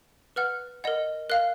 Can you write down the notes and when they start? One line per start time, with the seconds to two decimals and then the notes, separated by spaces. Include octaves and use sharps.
0.36 B4 F#5 F6
0.84 A#4 D#5 F#5
1.30 A#4 F5 F#6